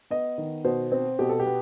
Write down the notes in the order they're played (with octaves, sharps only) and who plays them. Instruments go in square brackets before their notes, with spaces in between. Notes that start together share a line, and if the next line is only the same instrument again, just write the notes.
[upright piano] B3 D#5
D#3
B2 C5
C4
B2 G4
A4
G4
B3